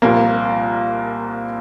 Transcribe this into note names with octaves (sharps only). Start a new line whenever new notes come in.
C2 A#2 F3 A#3